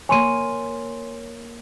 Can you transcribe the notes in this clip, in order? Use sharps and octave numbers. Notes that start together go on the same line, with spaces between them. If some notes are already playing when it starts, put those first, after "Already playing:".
A#3 C#5 G#5 C6 D#7